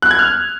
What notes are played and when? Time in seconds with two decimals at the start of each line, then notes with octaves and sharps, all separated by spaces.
0.02 F#6
0.11 G#6
0.19 F6